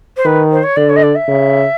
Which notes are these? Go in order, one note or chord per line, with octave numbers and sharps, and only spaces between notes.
C5
D#3 B4
C5
C#5
D3 D5
C#5
D#5
D5
E5
C#3